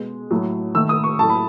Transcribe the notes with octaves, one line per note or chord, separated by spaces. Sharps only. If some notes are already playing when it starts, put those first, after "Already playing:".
Already playing: B2 G#3
A2 F#3 A3
D#3 A3 E6
D#6
C#6
A2 F#3 A3 A5
B5